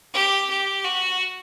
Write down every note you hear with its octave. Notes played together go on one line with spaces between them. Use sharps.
G4
G4
F#4